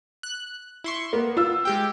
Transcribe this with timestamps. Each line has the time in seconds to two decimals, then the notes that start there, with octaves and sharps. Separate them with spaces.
0.23 F#6
0.84 E4 C6 C#6
1.13 A#3 B3
1.37 F4 E6
1.65 G#3 G4 G5